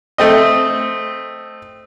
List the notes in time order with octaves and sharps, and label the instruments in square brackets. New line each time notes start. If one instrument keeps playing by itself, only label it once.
[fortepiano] A3 C4 D#5